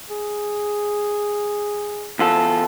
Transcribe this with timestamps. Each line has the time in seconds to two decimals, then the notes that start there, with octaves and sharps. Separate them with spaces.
0.10 G#4
2.19 E2 F4 A4